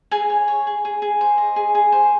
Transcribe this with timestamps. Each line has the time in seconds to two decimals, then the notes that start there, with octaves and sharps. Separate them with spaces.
0.11 G#4 G#5
0.29 C#5
0.48 C#5
0.67 G#4
0.85 G#4
1.02 G#4
1.21 C5
1.38 D#5
1.56 G#4
1.75 G#4
1.92 C5